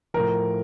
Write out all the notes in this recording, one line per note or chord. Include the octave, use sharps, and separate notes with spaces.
A2 F3 A#4